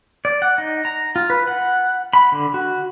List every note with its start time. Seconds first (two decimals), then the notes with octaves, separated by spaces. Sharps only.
0.25 D5
0.42 F#5
0.58 D#4
0.85 A#5
1.16 F4
1.30 B4
1.47 F#5
2.13 B5
2.32 D3
2.54 F#4